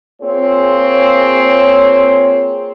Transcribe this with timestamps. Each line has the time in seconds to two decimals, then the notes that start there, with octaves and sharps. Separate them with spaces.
0.22 A#3 C4 F4 G#4 C#5